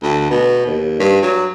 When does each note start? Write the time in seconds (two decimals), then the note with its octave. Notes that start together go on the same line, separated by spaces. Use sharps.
0.03 D2
0.31 B2
0.66 D#2
1.00 G2
1.22 F#3